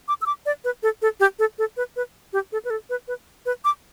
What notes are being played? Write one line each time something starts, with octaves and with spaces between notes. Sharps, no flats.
D6
E6
D6
D5
B4
A4
A4
G4
A4
A4
B4
B4
G4
A4
B4
A4
B4
B4
B4
D6